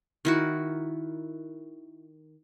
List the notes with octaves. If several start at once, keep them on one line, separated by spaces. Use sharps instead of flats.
D#3 E4 F#4